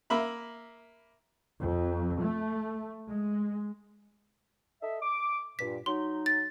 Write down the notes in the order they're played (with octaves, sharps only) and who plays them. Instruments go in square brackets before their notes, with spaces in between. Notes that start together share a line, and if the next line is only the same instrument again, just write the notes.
[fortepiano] A#3 E5 B5
[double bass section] F2
A3
G#3
[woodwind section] A4 D#5 E5
D6
[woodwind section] G2 A#2 [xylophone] B6
[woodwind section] F#3 D#4 [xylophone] C6
[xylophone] A6